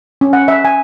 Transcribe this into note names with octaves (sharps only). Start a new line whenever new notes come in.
C#4
F#5
E5
G#5